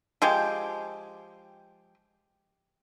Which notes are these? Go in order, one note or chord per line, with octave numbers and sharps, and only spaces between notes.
F3 G#3 G4